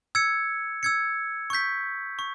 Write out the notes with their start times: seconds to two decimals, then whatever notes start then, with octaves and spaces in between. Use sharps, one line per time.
0.15 E6 G#6 C#7
0.83 E6 G#6 C#7
1.50 C#6 G6 B6
2.19 C#6